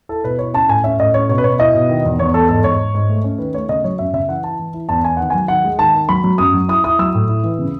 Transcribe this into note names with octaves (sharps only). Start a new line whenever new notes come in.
E4 A4
B2 B4
E4 C#5
C#4 A5
A2 G#5
C#4 E5
A2 D#5
C#4 C#5
B2 C#5
B4
B2 C#5
E4 D#5
B2
D#3
E2
E2 C#5
E2 A4
G#2 A4
G#2 C#5
G#2
G#2
A3
C#4
D#3 B4
A3 C#5
C#3 D#5
F#3 C#5
F#2 E5
C#3 E5
E3 F#5
E4 A5
E3
E4
E2 A5
B3 G#5
D#3 F#5
F#3 G#5
D#3 F#5
G#3
D#3 A5
D#3
F#3 B5
F#3
F#2 D#6
F#3
E4 D#6
E4 D#6
F#3 E6
A2
E4
E3
C#3